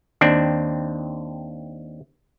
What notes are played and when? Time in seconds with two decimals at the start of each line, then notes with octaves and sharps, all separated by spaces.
0.21 D#2 C4 D4